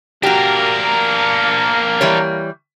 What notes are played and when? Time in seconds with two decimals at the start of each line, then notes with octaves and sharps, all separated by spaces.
0.23 A#3 D4 F#4 G4 A#4
2.01 E3 G3 C#5